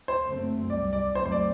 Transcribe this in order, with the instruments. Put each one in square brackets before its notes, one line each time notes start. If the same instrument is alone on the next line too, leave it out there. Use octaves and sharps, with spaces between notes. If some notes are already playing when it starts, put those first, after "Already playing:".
[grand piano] C5
[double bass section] F#1 F#2 D3 A3 C4
[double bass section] C2 C3 G3 [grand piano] D5
[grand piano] D5
[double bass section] F#1 F#2 F#3 A3 C4 [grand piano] C5
[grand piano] C5
D5